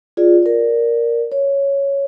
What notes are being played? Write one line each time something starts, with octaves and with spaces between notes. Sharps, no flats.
F4 G#4 D5
A#4 D5
C#5